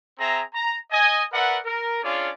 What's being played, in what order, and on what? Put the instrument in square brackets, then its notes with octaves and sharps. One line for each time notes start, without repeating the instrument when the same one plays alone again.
[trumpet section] C4 G#4 E5 A#5
A#5
D#5 G#5
A#4 B4 D5 E5 F#5
A#4
C#4 D4 F4 G#4 C#5 D5